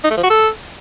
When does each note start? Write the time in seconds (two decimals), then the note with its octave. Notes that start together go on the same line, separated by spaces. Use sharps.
0.04 D#4
0.11 A3
0.17 F3
0.24 F#4
0.30 A4